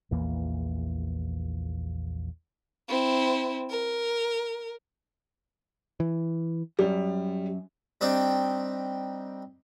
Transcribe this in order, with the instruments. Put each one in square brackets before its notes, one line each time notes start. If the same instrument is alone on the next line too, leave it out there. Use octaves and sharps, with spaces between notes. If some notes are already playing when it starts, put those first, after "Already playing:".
[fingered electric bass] A#1 E2 E3 A#3
[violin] C4 E4
A#4
[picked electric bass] E3
[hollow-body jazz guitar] F#2 [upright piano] G3
[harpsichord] G3 C4 D4 D#4